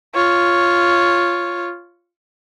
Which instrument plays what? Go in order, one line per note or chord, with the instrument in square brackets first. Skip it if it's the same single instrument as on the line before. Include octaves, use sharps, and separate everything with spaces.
[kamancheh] F4 C#5